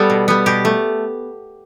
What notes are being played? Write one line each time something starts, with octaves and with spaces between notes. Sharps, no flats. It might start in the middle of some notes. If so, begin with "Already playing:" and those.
Already playing: G3 B3 A4
B2
G3 B3
B2 G4
A3